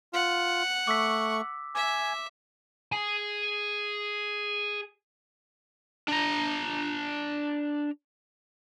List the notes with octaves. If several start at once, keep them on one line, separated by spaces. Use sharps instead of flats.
F4 F#5
A3 C#6 D6 E6 B6
E5 G#5 D6
G#4 G#5
D4 A#5